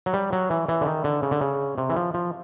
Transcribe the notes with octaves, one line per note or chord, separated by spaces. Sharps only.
F#3
G3
F#3
E3
E3
D3
D#3
D3
C#3
D3
C#3
C3
E3
F3
F3